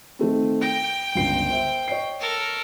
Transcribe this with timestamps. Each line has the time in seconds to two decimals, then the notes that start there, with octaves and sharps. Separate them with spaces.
0.19 D#3 A3 C4
0.62 G5 A#6
1.15 G1 C#2 C7
1.49 A#4 C5 E5
1.88 C#5 D#5 C7
2.21 A4 A#4